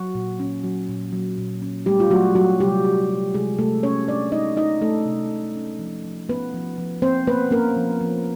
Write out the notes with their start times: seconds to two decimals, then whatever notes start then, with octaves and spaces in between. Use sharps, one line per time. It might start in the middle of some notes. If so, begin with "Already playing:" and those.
Already playing: F#3 F#4
0.15 A#2
0.40 C#4
0.64 F#3
0.89 A#2
1.12 F#3
1.38 A#2
1.62 C#4
1.86 G3 A3 G4
2.00 F4
2.11 F#3 A3 F#4
2.35 F#3 F#4
2.60 C3 G3 G4
2.85 C3
3.10 C3
3.34 C3 G#3 G#4
3.58 C3 A3 A4
3.83 G#3 C#4 C#5
4.08 G#3 D4 D5
4.32 G#3 D#4 D#5
4.57 C3 D#4 D#5
4.81 C3 A3 A4
5.06 C3
5.31 C3
5.56 C#4
5.79 F3
6.05 F3
6.29 B3 C#4 B4
6.54 F3
6.78 F3
7.02 A#3 C4 C5
7.27 A#3 B3 B4
7.51 A#3 C#4 A#4
7.76 F3
8.01 F3